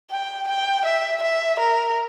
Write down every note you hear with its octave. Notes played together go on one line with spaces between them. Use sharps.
G5
G5
E5
E5
A#4